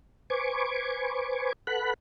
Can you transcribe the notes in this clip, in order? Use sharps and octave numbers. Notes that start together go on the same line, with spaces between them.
B4 C5 G#5 C#6 D6
A4 B4 F#5 B5 F#6